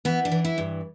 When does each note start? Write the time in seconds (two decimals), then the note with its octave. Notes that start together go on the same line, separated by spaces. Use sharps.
0.05 E3 B3
0.25 D4
0.32 E3
0.45 E4
0.58 G2